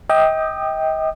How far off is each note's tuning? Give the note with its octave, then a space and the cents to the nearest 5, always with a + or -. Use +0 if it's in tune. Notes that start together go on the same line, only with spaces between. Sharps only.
D#5 +35 G5 +0 D#6 -45